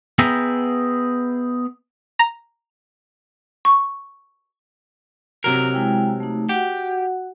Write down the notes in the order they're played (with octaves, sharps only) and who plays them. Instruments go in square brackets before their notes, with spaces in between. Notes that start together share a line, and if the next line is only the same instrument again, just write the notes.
[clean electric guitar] B3 G#4 E5 G5 A#5
[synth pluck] A#5
[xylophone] C#6
[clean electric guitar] C3 F#3 A#4 [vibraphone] F#4
[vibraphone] G#3 E4 G5
A3 D#4
[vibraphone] F#4 F#5 [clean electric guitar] G4